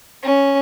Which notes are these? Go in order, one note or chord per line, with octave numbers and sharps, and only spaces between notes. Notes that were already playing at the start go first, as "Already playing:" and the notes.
C#4